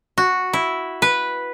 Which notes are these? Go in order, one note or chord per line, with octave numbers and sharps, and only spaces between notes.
F#4
E4
B4